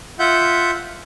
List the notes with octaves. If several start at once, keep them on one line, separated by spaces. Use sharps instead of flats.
F4 E5 F#5 G6